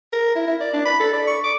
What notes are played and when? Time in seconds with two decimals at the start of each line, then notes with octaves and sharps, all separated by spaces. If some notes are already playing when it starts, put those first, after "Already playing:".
0.13 A#4
0.35 E4
0.47 E4
0.61 D5
0.73 D4
0.85 B5
1.00 A4
1.13 D5
1.27 C#6
1.44 D6